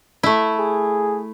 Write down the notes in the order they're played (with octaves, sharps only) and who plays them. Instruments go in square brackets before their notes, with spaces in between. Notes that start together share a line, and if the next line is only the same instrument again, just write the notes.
[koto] A3 E4
[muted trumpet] G#4